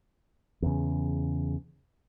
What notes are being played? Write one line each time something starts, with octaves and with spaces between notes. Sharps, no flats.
E2 C#3